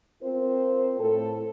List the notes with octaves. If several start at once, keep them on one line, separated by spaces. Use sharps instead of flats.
C4 F4 A#4 C5
A2 A4